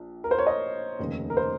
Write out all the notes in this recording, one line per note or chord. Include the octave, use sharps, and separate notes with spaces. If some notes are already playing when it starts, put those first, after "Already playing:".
Already playing: A#1
A#4
C5
C#5
D#5
F1 D#2 C#3
A#4
C5